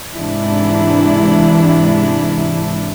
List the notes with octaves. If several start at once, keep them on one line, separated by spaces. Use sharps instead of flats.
G#2 C3 E3 D4 E4